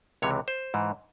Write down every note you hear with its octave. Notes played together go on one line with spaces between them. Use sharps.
C#2 C3 E3 C#5
C5
G#2 E3